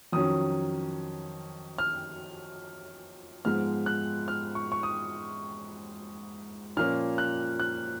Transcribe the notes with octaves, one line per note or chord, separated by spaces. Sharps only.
F2 D#3 F#3 C#4 D#6
F6
G#2 F3 G#3 B3 F6
F#6
F6
C#6
C#6
D#6
A#2 F3 A#3 C#4 F6
F#6
F#6